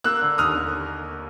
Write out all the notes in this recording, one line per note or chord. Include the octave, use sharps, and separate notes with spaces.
A#3 E6 F#6
D3
D#2 D#6 F6
A#3